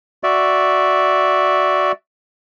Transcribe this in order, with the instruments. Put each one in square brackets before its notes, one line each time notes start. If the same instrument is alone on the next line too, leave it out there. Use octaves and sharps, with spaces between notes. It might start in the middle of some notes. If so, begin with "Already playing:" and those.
[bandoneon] F#4 D5 E5